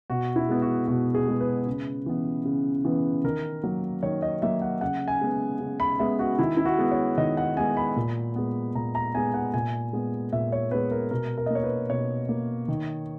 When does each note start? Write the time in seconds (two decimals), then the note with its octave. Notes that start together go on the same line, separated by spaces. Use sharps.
0.10 B2 F#4
0.36 E4
0.49 G#3 B3
0.62 F#4
0.88 B2 F#4
1.15 G#4
1.27 G#3 B3
1.40 B4
1.67 C#3
2.06 E3 B3
2.45 C#3
2.85 E3 B3
3.24 D#3 A#4
3.63 F#3 A#3
4.03 D#3 C#5
4.22 D#5
4.42 F#3 A#3 E5
4.62 F#5
4.81 C#3 F#5
5.08 G#5
5.21 G#3 B3
5.60 C#3
5.80 B5
5.99 G#3 B3 E5
6.19 F#4
6.39 D#3 E4
6.57 E4
6.65 F#4
6.78 G#3 B3
6.91 C#5
7.17 D#3 D#5
7.37 F#5
7.57 G#3 B3 G#5
7.77 B5
7.96 A#2
8.36 G#3 B3
8.75 A#2 A#5
8.95 A#5
9.15 G#3 B3 G#5
9.34 F#5
9.54 A#2 G#5
9.93 G#3 B3
10.33 A#2 E5
10.52 C#5
10.71 G#3 B3 B4
10.91 A#4
11.11 B2 A#4
11.38 A#4
11.46 D#5
11.50 A#3 C#5
11.64 B4
11.90 B2 C#5
12.29 A#3
12.68 D#3